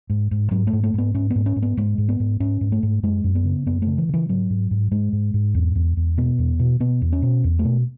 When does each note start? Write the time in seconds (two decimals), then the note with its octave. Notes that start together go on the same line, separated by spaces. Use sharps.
0.10 G#2
0.31 G#2
0.51 G#2 F#3
0.67 A3
0.73 G#2
0.83 A3
0.94 G#2 B3
1.14 G#2 C#4
1.30 B3
1.35 G#2
1.46 C#4
1.56 G#2
1.62 B3
1.77 G#2 G#3
1.98 G#2
2.09 B3
2.20 G#2
2.40 G#2 C#4
2.61 G#2
2.72 A3
2.83 G#2
3.03 F#2 G#3
3.24 F#2
3.35 B3
3.45 C#3
3.66 F#2 B3
3.82 C#3 A3
3.98 E3
4.09 C#3 E3
4.29 G#2 F#3
4.50 G#2
4.71 G#2
4.91 G#2 G#3
5.13 G#2
5.34 G#2
5.54 E2
5.75 E2
5.97 E2
6.17 B2 B3
6.38 E2
6.59 B2
6.80 B2 B3
7.02 E2
7.13 C#4
7.22 B2
7.44 E2
7.59 A3
7.65 B2